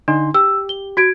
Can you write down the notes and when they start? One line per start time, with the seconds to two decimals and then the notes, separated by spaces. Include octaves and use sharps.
0.08 D3 D4 D#4 C6
0.34 G4 E6
0.69 G7
0.97 F#4 G#6 D7